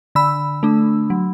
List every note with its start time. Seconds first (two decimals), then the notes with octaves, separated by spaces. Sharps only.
0.15 D3 B5 E6
0.63 A3 D4
1.10 F#3